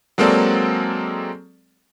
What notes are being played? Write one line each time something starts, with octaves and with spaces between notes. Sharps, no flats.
F#3 G#3 A#3 C4 A4 D5